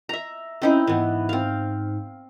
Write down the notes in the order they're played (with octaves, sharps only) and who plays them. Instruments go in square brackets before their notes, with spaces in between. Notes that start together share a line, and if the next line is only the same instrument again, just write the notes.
[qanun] E5 A#5
[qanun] C4 D#4 E4 [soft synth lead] C#4
[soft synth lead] G#2 [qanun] E3 B3
[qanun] C4 F5